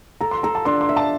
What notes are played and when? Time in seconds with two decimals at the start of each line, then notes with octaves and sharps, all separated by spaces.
0.21 A4 A#5
0.31 C6
0.43 A4 A#5
0.55 A5
0.65 D4 C6
0.81 C6
0.89 E5
0.96 A5